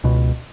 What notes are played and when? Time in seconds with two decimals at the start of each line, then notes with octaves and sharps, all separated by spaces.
0.04 C#2 B2